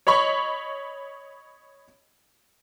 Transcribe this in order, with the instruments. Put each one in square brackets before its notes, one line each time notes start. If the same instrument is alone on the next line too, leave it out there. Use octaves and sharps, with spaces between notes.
[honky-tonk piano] C#5 D#5 B5 C#6